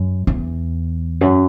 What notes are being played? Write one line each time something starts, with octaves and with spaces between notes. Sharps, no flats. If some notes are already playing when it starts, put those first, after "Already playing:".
Already playing: F#2
E2
F#2